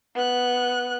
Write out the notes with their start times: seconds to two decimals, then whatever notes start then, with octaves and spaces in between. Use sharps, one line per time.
0.15 B3 F#6